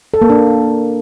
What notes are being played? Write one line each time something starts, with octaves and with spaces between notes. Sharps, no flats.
A4
A#3
D4